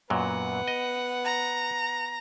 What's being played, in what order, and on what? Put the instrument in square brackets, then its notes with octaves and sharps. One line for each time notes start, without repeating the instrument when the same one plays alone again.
[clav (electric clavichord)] F#2 A#2 F#3 [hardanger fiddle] B3 F#5
[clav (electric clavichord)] D#5
[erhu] A#5